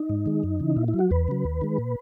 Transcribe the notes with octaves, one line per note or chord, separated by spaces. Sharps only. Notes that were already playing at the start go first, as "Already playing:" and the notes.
Already playing: D#4
G#2
D#3 G#3
F#2
C#3 E3
A#2 E4
E4
F#3
F#4
E2 B4
C#3 F#3
D#2
D#3 G#3
A#2